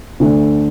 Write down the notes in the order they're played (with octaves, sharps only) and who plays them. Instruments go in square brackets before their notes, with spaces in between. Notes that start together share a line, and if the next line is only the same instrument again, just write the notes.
[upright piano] D2 D3 A3 D4